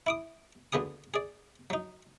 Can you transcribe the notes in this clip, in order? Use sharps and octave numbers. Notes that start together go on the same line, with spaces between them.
E4 D6 D#6
D2 D3 B3 G#4 D#6
G#4 D5
F#3 D#4